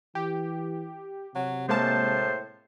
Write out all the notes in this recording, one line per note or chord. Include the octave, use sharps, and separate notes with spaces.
E3 G4
C3 F#3
A2 G#3 A#3 C5 A5